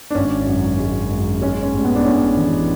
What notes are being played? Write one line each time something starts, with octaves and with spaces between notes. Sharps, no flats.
D4
G#1 C#4
F#2
G#3
F#2
G#3 C#4
C#4
A1
B3
D4
A2 C#4
E3